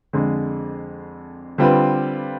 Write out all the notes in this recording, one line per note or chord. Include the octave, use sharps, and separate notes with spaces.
F2 D3 G#3
D3 G3 C4 F4 B4